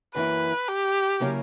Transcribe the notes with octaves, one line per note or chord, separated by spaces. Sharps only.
F#2 E3 A#3 E4 B4
G4
C#3 F#3 A#3 C#4 E4